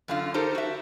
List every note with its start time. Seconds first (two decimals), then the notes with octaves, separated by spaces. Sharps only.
0.08 F#2 D3 F4
0.34 D#4 G4 A4 A#4 C5
0.55 F#4 E5